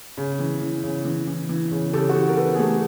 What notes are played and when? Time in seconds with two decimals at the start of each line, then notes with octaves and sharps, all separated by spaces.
0.17 C#3
0.39 E3
0.62 E3
0.84 C#3
1.05 E3
1.27 E3
1.49 E3
1.71 C#3
1.93 C#3 G4 A4
2.09 F#4
2.15 E3 G4
2.29 A#4
2.37 E3 A4 B4
2.55 G#4
2.59 A3 G4 A4